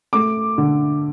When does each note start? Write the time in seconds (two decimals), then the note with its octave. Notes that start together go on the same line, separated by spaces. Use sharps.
0.13 A3 D6
0.58 D3